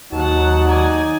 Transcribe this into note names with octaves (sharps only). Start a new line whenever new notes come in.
D#2 F#3 D#4 F#5 A5
D5 G#5